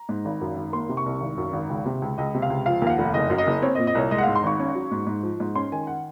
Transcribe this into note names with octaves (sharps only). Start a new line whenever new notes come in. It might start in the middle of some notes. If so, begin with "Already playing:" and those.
Already playing: A#5
G#2
G#1
F#2
G#1
A#3 C6
C3
C#6
C2
G#1
F#2
G#1
C#2
C3
C#2
C#2 D#5
C3
F5
C#2
F3 F5
D#2 F5
F#5
F1
F#1 D#5
F#2
D#5
F#1
C4 C#5
D#5
A#2
D#5
C2 C#5
G#3 D#5
F#5
F5
G#2
C6
G#1 C#6
C#4
F#3
G#2
G#2
F3
G#2
C#4 C6
D#3 G#5
F#5